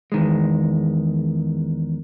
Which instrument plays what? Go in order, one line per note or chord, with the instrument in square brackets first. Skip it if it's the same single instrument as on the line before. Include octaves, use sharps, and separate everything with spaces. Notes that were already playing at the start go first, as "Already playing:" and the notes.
[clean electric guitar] E2 D#3 G#3